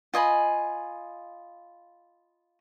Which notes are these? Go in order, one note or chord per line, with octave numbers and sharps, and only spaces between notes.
F4 D#5 G#5 B5